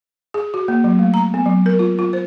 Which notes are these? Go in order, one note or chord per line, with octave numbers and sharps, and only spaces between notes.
G#4
F#4
A#3
F#3
A3
A#5
B3
F#3
A#4
F4
F4
C5